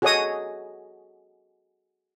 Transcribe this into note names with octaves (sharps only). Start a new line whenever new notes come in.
F#4 G#4 A4 C#5 D#5 D#6